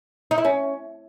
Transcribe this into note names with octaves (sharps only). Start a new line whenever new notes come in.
D#4
E4
C#4